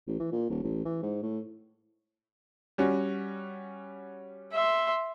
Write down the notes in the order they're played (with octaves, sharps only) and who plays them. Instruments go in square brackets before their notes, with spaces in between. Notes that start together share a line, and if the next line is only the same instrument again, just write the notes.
[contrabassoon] A1
E3
A#2
D#1
A1
E3
G#2
A2
[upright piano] G3 C#4 F#4
[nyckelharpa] E5 C6